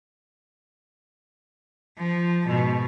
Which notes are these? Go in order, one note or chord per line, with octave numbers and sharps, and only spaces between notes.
F3
G#2 B2